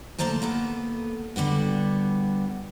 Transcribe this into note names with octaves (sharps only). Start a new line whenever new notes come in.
D2 A#3 A4 C5 A5 A#5
A#3 B3 A4
D3 G3 B3 F#4